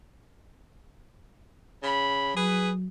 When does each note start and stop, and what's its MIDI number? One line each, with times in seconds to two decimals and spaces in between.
1.83 2.31 49
1.83 2.31 83
2.36 2.88 54
2.36 2.70 68
2.36 2.70 71